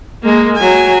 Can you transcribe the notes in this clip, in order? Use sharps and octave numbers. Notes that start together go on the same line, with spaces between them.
G#3 A#3
F#3 G#5